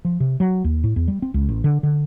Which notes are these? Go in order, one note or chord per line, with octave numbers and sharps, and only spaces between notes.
F3
C3
F#3
D#2
A2
E2
G3
C4
C#2
A1
D3
D3